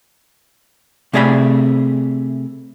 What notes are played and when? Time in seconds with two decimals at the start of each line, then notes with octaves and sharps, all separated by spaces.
1.13 C3 A3 G#4 D5 E5 B5